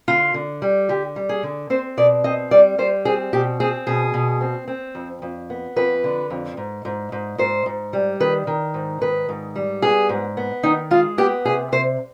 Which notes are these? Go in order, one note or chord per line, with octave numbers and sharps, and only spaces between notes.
D3 F4
D3
G3
D3 G4
G3
G#4
D3
C4 C5
B2 D5
C4 D#5
G3 D5
G3 C5
C4 G#4
B2 G4
C4 G#4
B2 G#4
B2
C4
C4
F2
F2
B3
F2 B4
D3
F2
G#2
G#2
G#2
G#2 C5
G#2
G3
D#3 B4
D#3
G#2
D#3 B4
G#2
G3
B3 G#4
G#2
B3
D#3 D#4
G#3 F4
B3 G4
C3 G#4
C3 C5